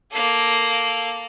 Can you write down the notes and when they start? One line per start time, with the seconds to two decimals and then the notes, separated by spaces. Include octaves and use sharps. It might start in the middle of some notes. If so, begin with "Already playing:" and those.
0.11 A#3 A4